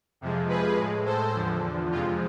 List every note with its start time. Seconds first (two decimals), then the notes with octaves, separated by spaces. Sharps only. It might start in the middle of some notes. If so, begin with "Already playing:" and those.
0.21 F2 C3 F3 G#3
0.49 G#4 B4
0.77 A2 G#3
1.06 A4 C5
1.34 E2 D3 F3
1.91 F2 C3 F3 G#3 F4